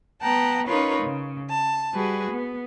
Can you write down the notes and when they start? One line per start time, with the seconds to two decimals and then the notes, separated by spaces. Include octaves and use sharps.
0.22 B3 F#5 G5 A5 A#5
0.67 C#4 D#4 F4 A#4 B4 C#5
1.02 C#3
1.50 A5
1.93 G3 F#4 G#4 B4
2.30 B3